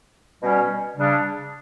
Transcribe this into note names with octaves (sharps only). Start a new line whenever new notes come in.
B2 G3 C#4
C#3 G3 D4